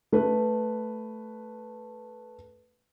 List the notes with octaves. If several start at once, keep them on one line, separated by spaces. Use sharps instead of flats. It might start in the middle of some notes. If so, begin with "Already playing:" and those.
A3 B4